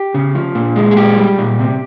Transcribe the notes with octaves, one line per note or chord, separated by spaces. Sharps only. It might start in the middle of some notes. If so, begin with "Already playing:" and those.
Already playing: G4
C#3
F3
A#2
G#3
G#4
A#2 G4
G3
A#2
C3